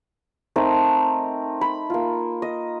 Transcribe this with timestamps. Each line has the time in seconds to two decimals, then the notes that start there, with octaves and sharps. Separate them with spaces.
0.56 A3 C4 D#4 A#4
1.61 B5
1.90 A#3 F4
2.42 D#5